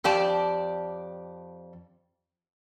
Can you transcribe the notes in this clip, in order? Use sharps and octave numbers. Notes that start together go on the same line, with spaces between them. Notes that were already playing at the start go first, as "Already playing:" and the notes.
F2 G4 D5 A5